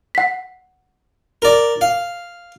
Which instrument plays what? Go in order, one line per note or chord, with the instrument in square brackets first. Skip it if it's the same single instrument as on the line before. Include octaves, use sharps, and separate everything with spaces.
[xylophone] F#5 B6
[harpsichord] A#4 D5
F5